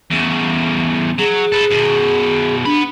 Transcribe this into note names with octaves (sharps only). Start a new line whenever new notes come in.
E2 C#3
F#3 G#4
A4 B4
F#2 B2
B3 D4 B5